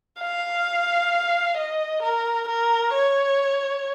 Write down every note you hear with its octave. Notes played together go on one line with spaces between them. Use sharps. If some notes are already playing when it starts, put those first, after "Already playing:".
F5
D#5
A#4
A#4
C#5